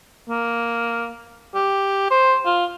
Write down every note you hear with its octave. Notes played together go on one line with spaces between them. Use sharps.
A#3
G4
C5
F4